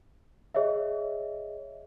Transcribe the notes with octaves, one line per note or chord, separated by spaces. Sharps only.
G#4 C#5 D#5 E5